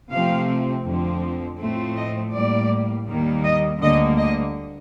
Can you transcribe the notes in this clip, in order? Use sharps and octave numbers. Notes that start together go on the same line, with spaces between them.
C3 F3 A3 C4 F5
F2 D3 F3 C4
A2 F3 A3 C4
D#5
A2 G3 A#3 D5
D#2 D#3 G3 A#3
D#5
D2 D3 G3 A#3 D#5
D#5